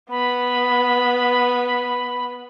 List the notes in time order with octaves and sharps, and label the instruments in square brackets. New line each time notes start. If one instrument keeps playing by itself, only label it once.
[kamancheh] B3 [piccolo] B5